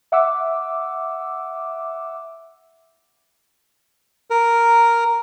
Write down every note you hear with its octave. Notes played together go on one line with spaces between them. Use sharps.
E5 F#5 D6 E6
A#4